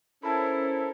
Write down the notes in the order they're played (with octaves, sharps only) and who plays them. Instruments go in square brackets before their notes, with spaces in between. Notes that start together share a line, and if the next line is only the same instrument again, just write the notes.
[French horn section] C#4 C5 [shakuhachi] E4 [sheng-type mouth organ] A4 A#4 [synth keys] A5 B5